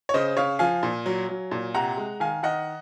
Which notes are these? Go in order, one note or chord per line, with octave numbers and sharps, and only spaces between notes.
C#5
C#3 C5 D#5
C#3 C#5 F5
F3 F5 G#5
A#2
F#3
F#3
A#2
C3 F#5 A#5
G#3
D#3 F5 G#5
D#3 D#5 F#5